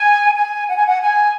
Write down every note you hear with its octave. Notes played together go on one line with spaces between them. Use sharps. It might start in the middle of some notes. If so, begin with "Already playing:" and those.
Already playing: G#5
G#5
F#5
G#5
F#5
G#5